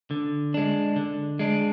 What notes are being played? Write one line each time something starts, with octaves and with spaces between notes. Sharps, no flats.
D3
G#3 D4
D3
G#3 D4